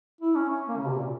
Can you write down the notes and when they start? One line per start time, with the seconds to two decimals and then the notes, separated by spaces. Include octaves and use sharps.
0.21 E4
0.35 C#4
0.50 C#4
0.68 A#3
0.78 C#3
0.87 C3
0.97 A#2